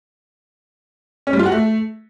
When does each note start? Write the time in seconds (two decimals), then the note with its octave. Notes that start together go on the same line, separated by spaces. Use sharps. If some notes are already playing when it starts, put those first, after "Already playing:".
1.27 C#4
1.33 G3
1.39 F4
1.46 F#4
1.52 A3